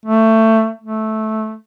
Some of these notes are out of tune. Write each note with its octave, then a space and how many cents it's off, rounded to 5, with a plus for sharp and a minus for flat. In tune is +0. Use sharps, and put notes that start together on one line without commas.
A3 +15
A3 -10